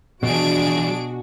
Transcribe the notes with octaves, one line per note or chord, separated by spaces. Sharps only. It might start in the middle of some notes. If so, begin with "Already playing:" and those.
B2 E3 F3 D4 F#4 G#4 D7